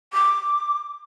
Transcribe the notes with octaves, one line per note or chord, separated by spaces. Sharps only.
D6